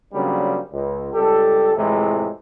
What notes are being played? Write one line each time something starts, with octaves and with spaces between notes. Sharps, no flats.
C#3 F#3 G3 A#3 C4 D4
C#2
C#2 G3 G4 A4
F2 A2 C3 E3 G#3